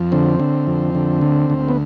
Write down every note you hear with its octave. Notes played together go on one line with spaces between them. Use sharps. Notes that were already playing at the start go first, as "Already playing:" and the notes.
Already playing: F2
D3 C4
D3
F2
D3
D2
D2
B3